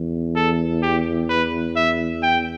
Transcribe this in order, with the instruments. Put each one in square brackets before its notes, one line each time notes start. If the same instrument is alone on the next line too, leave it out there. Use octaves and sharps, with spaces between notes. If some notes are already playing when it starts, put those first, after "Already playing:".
Already playing: [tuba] E2
[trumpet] A4
G4
B4
E5
G5